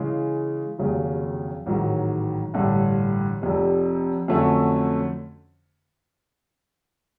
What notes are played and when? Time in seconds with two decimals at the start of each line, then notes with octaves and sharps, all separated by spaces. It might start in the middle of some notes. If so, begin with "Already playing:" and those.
Already playing: C#3 E3 G#3
0.78 F1 D#2 C#3 F#3
1.66 A1 G#2 D#3 F#3
2.54 A1 G2 D3
3.41 F1 F2 C3
4.28 F2 D3 F#3 A3 C#4